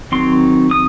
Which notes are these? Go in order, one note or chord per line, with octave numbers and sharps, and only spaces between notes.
D#3 F#3 C4 C6
D#6